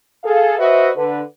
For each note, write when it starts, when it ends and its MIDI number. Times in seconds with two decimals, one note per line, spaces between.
0.24 0.55 68
0.24 0.55 69
0.24 0.55 77
0.58 0.90 66
0.58 0.90 71
0.58 0.90 72
0.58 0.90 75
0.58 0.90 76
0.96 1.20 50
0.96 1.20 71